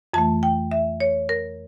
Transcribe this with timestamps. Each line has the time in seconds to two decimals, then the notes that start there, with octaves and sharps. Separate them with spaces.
0.14 F2 E3 A3 A5
0.43 G5
0.71 E5
1.00 C#5
1.29 A#4